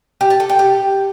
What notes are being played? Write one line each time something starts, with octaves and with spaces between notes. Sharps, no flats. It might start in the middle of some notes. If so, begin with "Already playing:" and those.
G4
A5
A4
G5
G4